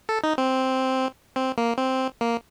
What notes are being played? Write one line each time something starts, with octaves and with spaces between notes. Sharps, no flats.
A4
D#4
C4
C4
A#3
C4
A#3